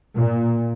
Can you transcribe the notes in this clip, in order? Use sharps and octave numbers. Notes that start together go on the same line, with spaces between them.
A#2